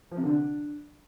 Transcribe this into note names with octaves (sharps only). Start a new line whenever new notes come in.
F3
C3
D3
D4